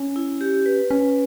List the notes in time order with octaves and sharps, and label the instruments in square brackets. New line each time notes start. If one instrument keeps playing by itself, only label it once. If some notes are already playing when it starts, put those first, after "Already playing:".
Already playing: [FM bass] C#4
[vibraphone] E4
G4
B4
[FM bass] C#4 [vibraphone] B4